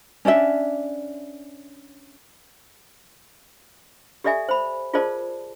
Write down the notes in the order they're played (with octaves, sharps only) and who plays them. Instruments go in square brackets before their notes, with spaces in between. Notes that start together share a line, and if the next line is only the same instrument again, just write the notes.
[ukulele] C#4 D4 D5 E5
[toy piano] G4 A4 D5 E5 G#5
C5 B5
F4 G#4 A#4 C5 D5 A5